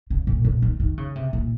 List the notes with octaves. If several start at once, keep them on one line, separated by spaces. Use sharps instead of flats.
C#3
A#2
A#2
D#3
D#3
C#3
C3
A#2